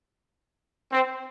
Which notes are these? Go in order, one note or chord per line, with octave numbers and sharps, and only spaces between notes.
C4